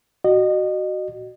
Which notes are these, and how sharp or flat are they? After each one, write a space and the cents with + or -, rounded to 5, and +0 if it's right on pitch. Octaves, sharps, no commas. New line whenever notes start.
F#4 +15 D#5 -30